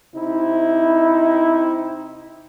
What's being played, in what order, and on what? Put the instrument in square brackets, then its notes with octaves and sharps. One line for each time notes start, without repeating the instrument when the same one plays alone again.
[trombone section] C3 D#4 E4